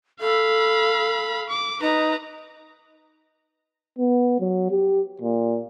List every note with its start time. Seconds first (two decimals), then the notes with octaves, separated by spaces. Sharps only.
0.21 A4 F5 B5
1.49 D6
1.81 D#4 B4 A#5
3.99 B3
4.40 F#3
4.71 G4
5.22 A#2